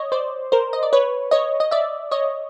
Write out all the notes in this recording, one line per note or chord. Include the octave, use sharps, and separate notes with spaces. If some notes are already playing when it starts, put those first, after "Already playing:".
Already playing: C#5 D#5
C5 D5
A#4 C5
D#5
D5
B4 C#5
C#5 D#5
D#5
D5 E5
C#5 D#5